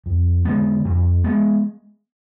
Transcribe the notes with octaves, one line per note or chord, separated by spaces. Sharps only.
F2
D3 G#3 B3
F2
G#3 B3